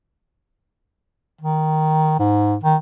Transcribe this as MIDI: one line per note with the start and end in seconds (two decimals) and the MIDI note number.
1.41 2.18 51
2.19 2.56 44
2.64 2.76 51